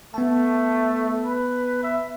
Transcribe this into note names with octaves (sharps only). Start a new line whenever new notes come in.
A3 B3 A5
B4
E5